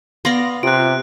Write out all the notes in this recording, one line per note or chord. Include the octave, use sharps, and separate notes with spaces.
B3 D5 F5 C6 A#6
C3 F4 F#6 D7